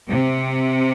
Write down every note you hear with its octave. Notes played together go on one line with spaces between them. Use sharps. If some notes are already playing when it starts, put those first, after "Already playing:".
C3